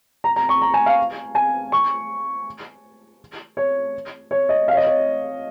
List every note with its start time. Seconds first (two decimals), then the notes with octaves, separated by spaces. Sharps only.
0.24 A#5
0.36 A#5
0.49 C#6
0.62 A#5
0.74 G#5
0.86 F5
1.35 G#5
1.72 C#6
3.57 C#5
4.31 C#5
4.49 D#5
4.68 F5
4.73 C#5
4.77 D#5
4.87 C#5